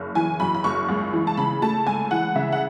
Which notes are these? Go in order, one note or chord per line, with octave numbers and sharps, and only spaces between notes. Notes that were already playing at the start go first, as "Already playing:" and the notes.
Already playing: F#1
E3 G#5
F#2 B5
B5
F#1 C#6
C#2
E3
A5
C#3 B5
A3 A5
C#2 G#5
E3 F#5
C#3 E5
F#5